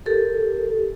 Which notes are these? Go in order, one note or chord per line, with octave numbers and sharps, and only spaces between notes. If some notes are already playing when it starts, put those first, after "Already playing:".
G4 A4 A#4